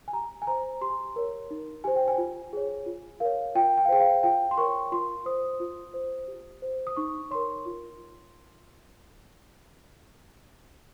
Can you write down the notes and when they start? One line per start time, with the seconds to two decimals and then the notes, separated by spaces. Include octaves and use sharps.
0.08 G#5
0.13 G4 A#5
0.42 G#5
0.47 C5 A#5
0.81 G4 C6
1.16 A#4 C#5
1.51 D#4
1.84 G4 C5 G#5
1.96 G5
2.08 G#5
2.18 F4
2.53 G#4 C#5
2.86 F4
3.20 A#4 C#5 F5
3.55 F4 G5
3.78 G5
3.85 F5
3.89 G#4 C5 G5
4.00 F5
4.23 F4 G5
4.51 C6
4.58 A#4 C#5 C#6
4.92 F4 C6
5.26 C5 D#6
5.60 F4
5.94 C5
6.28 G4
6.62 C5
6.87 D#6
6.96 D#4 C#6
7.31 A#4 C#5 C6
7.66 F4